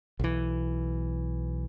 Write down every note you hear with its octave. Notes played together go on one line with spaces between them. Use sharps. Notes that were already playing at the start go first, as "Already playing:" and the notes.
B1 E3